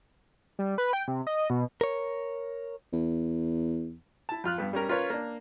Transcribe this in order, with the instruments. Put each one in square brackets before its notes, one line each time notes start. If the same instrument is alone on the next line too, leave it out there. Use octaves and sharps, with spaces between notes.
[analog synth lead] G3
B4
G5
C3
D#5
B2
[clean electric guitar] A#4 C#5
[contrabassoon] E2
[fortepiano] E4 A5
F2 F4 F6 F#6
G2 B3
G3 C#4 A#4
C#4 F4 A#4 B4 C#5
A#3 D4